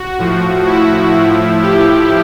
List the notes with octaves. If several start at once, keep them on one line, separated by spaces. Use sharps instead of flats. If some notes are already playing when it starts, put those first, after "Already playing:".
Already playing: F#4
A2 F3
E4
A2 F3
G4